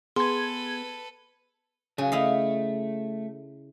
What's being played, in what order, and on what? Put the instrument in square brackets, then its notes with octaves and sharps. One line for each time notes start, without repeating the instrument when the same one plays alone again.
[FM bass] B3 [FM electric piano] G#4 G#6 [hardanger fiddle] A4 B4 [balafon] C6
[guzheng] C#3 [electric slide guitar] F#3 G#5
[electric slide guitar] A3 [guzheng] E4 D#5 F5